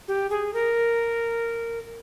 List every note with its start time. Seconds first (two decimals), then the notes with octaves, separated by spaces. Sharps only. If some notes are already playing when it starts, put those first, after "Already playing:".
0.08 G4
0.30 G#4
0.53 A#4